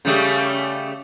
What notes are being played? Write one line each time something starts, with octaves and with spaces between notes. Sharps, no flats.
C#3 G3 A3